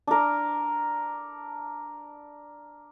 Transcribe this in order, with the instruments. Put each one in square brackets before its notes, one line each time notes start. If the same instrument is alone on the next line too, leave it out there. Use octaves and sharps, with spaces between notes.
[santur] D4 A#4